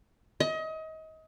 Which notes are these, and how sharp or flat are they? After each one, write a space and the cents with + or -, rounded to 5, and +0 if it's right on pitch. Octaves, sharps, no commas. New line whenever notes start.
D#5 +30